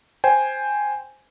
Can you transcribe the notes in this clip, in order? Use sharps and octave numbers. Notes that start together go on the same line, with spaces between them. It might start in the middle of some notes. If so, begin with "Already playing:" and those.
C5 G5 G#5